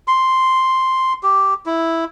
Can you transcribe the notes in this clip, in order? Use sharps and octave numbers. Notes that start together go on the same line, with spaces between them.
C6
G4
E4